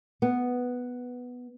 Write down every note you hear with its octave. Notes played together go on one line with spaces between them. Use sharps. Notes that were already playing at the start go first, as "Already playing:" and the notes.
B3